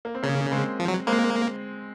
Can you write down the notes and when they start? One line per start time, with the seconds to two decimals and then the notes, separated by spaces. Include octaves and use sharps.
0.05 A#3
0.15 C4
0.23 C#3 A#3 C#4
0.51 G#3 C4
0.79 F3
0.88 F#3
1.07 G#3 A#3 C4